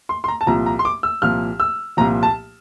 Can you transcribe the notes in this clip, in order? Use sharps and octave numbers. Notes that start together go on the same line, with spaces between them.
C6
C6
A#5
A5
C2 A#2 F3 A#5
A#5
C6
D6
E6
C2 A#2 F3 F6
E6
C2 A#2 F3 A#5
A5